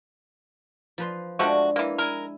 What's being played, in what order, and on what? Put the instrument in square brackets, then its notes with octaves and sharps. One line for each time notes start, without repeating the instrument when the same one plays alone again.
[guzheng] F3 B4 C6
[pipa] F3 A3 F#4 [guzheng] G#3 D4
[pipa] E3 A#3
[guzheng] E4 G#5 [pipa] A#4